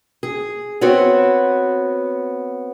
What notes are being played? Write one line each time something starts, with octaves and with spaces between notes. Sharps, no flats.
G#4
B3 C4 F#4 C#5